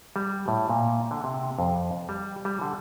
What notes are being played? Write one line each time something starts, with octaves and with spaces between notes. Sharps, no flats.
G3
A2
A#2
D3
C3
F2
G3
G3
D3